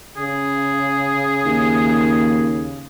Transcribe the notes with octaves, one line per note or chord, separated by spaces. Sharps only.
C#3 G#4
D#2